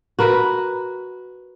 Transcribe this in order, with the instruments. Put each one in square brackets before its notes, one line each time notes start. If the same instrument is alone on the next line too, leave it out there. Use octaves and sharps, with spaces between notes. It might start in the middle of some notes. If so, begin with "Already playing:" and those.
[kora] F#4 A#4 B4